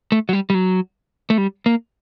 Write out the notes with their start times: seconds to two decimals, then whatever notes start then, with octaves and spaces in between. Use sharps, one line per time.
0.12 A3
0.29 F#3
0.33 G3
0.50 G3
0.54 F#3
1.30 A3
1.38 G3
1.66 A#3